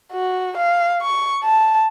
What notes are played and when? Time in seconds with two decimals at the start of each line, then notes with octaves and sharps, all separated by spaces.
0.13 F#4
0.58 F5
1.02 C#6
1.44 A5